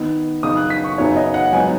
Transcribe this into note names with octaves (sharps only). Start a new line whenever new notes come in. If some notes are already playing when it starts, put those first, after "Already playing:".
Already playing: D#3 B3 D#4
F#2 C#3 B3 D#4 D#6
F#6
B6
C#6
F#2 C#3 F#3 B3 D#4 C#5
D#5
F#5
G#2 F#3 B3 D#4 G#5